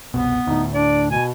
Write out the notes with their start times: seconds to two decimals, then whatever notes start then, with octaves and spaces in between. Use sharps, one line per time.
0.14 F#1 C2 B2 B3
0.47 D2 A2 D#4
0.72 D4 D5
1.11 B2 G#5